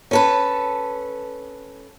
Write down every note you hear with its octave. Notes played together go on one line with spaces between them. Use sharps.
C#4 A4 B4